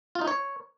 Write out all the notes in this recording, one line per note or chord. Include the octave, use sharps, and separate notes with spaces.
F4
D#4
C#5